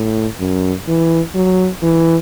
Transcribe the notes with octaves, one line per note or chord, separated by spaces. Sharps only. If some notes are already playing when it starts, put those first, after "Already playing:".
Already playing: A2
F#2
E3
F#3
E3